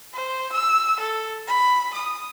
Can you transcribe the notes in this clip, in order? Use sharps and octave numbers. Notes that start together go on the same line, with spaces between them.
C5
E6
A4
B5
D#6